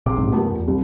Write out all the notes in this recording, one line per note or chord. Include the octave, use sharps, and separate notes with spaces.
A#1 C3 G#4 C6 D6
A1 G#2
F#2 A3 B3 F4 G4 A#4
E2
C2